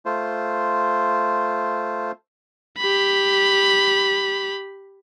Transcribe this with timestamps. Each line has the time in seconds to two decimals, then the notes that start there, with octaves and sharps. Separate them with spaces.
0.06 A3 F4 C5
2.78 G4 B5